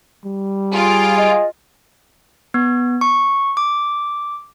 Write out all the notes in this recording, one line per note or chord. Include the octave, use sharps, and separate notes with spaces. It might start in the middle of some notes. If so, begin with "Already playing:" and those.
G3
F4 G#4 D7
D#5
B3
C#6
D6